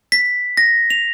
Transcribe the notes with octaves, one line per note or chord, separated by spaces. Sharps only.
B6
A#6
F7